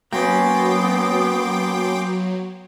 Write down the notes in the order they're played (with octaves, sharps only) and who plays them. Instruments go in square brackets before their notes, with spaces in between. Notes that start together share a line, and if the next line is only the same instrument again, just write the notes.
[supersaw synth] F#3 [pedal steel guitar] A#3 C#4 [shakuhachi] B3 [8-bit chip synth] G5 C6 D6